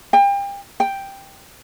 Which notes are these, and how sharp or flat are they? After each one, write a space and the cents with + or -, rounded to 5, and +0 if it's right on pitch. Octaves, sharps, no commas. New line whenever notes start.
G5 +35
G5 +0